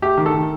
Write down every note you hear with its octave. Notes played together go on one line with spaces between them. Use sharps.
A3 G4
D#3
A4
D#3